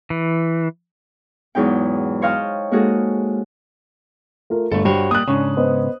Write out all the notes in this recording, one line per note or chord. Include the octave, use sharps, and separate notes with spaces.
E3
E2 G#2 F#3 D#4 G5
C5 C#5 D#5 F5 G5 A5
G#3 A#3 D#4 F#4 G#4 A4
A3 F4 A#4
G1 A3 A4
G2 F#4 C5 C#5 G5
G3 A#3 D#6 F#6
G#2 C#3 C#4 D4 C#6
B3 C5 D#5